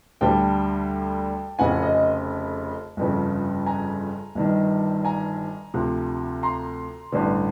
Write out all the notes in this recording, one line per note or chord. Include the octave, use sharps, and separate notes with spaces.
D2 D3 G3 G5 A5
F1 F2 C#3 F#5 G#5
D#5
G1 F2 C#3
G#5 A#5
G1 G2 D#3
G#5 A#5
D2 C3 F3
A#5 C6
A1 G2 D3